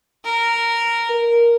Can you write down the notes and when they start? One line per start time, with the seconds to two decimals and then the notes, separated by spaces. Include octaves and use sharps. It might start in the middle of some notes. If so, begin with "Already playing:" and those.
0.24 A#4
1.10 A#4